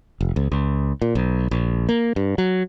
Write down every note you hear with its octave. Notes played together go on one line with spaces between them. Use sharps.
F1
C#2
C#2
A#2
B1
A#1
A#3
G2
F#3